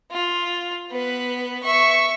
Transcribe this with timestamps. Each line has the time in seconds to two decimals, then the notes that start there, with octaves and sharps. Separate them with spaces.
0.11 F4
0.91 B3 B4
1.63 E5 C#6